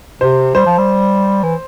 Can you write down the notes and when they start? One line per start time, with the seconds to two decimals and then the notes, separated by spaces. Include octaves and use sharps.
0.21 C3 C5
0.55 G3 C5
0.66 F3
0.78 G3
1.43 E3